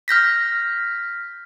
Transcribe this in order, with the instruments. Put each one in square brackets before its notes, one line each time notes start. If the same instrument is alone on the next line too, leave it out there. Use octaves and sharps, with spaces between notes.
[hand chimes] F6 G6 A#6 B6